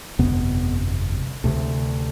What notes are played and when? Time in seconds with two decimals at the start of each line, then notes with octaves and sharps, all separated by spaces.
0.19 G1 F2 C3 B3
1.44 D2 C3